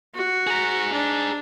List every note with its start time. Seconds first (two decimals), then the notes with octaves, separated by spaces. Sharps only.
0.15 F#4
0.47 G#4 A#5
0.92 D4